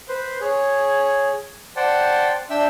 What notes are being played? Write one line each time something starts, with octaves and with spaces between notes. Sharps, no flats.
B4 C5
G#4 C#5
C5 D5 F#5 G5 A5
D4 E5 G5 E6